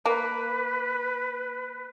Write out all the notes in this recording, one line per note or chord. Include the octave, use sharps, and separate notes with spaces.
A#3 B4